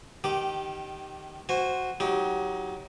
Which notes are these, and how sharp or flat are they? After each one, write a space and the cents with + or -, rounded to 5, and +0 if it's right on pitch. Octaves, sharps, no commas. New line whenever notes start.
D#3 -20 G4 -15 D6 +0
F#4 +0 C5 +0 G#5 -25
F#3 +0 D#4 +30 G4 +0